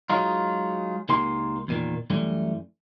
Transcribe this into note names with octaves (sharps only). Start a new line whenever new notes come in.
F#3 G#3 D#4 F4
C#2 A#3 D#4 G4 C6
E2 A#2 D#3
F#2 E3 G3 A3